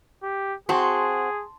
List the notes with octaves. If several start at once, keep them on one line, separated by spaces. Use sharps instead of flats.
G4
C4 F#4 G#4 A5 C6